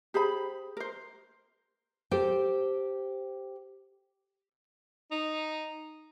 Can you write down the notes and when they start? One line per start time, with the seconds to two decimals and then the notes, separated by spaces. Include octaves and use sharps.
0.14 G4 G#4 C5 B5
0.77 A#4 C5
2.11 G4 A4 C5 G5
5.11 D#4